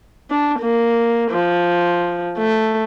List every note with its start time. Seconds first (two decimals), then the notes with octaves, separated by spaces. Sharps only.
0.30 D4
0.60 A#3
1.31 F3
2.38 A3